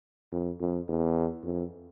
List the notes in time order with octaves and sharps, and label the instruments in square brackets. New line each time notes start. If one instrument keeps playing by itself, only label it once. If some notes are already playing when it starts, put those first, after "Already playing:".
[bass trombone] F2
F2
E2
F2